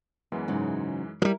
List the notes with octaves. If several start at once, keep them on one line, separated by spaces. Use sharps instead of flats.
F#2 E3 G#3 B3
G#2 C#3 F#3
F3 G3 E4 A#4